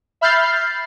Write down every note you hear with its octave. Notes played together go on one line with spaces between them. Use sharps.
E5 B5 F6 G6 A6 C7